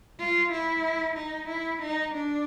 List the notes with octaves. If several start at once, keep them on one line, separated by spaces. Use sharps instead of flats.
F4
E4
D#4
E4
D#4
D4